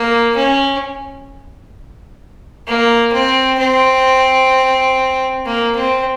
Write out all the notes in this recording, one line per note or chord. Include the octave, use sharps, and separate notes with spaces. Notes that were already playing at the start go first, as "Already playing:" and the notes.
Already playing: A#3
C#4
A#3
C4
C4
A#3
C4